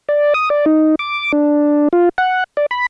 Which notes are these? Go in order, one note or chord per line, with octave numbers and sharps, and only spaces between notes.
D5
D#6
D5
D#4
D6
D4
F4
F#5
D5
B5